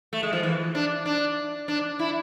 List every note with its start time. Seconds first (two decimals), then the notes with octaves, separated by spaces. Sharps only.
0.13 A3
0.23 G#3
0.33 F3
0.43 E3
0.75 D4
1.06 D4
1.68 D4
1.99 E4